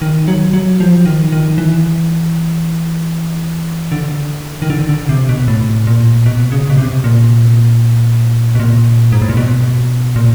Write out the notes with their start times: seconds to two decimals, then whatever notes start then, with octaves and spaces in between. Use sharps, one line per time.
0.02 D#3
0.28 F#3
0.53 F#3
0.80 F3
1.05 D#3
1.32 D#3
1.58 E3
3.92 D3
4.62 D#3
4.70 D3
4.89 D3
5.09 C3
5.29 B2
5.48 A2
5.87 A#2
6.26 B2
6.52 C#3
6.70 B2
6.77 C3
7.04 A#2
8.55 B2
8.60 A#2
9.12 G#2
9.22 A2
9.29 A#2
9.37 B2
10.16 A#2